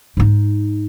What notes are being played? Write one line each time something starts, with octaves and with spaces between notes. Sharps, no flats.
G#2 D#4